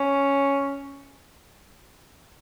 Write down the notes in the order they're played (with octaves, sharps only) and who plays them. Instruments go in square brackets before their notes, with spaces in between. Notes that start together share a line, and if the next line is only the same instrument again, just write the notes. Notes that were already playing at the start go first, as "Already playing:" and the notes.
Already playing: [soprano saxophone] C#4